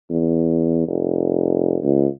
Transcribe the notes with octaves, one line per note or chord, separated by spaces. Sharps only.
E2
F1
C#2